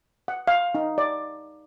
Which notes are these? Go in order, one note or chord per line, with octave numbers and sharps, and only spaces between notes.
F#5
F5
D#4
D5